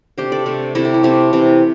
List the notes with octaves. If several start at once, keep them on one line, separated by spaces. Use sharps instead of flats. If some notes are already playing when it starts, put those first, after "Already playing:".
C3 A3 D4 G4 C5
A4 D5
C3 A3 D4
C3 A3 C4 E4 A4
G4
E4
C3 A3 C4 G4
C3 E3 C4